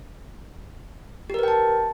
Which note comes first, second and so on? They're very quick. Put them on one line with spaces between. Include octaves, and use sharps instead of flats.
G4 A#4 B4 G5 A5